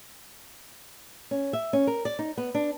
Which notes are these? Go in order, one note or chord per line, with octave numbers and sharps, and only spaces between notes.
C#4
E5
C#4
A#4
D5
D#4
B3
D4